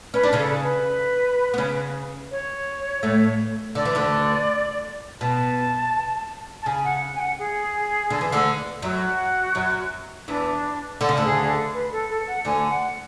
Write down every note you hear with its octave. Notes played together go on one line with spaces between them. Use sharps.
C#4 B4
D4
C#3 C#4 A4
B4
B3
C#3 C#4
C#5
A2 A3
D3 D5
E3
D2 D3
B2 A5
A5
C#3 G#5
F#5
G#5
F#5
G#4
D3
E3
D2 D3
F#2 F#3 F#4
F#2 F#3
E2 E3 D4
D3
C#3
D2 D3
G#4
G#4
A4
B4
A4
A4
F#5
D2 D3 G#5
F#5